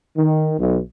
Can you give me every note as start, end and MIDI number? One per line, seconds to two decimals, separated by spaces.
0.16 0.51 51
0.58 0.78 35